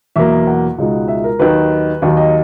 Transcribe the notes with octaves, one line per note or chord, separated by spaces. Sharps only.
E2 B2 F#3 A#3 E5
F#5
C#2 B2 G#3 D#4
E5
A#4
D#2 D#3 F#3 B4
D#2 D#3 F#3
D#5